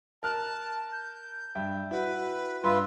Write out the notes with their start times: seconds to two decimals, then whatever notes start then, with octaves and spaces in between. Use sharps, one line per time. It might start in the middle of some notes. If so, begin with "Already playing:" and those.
0.23 A#4 A5 F6 F#6
0.92 G6
1.55 G2 E5 G5
1.91 E4 F#4 B4
2.64 G2 F4 B4 E5 C6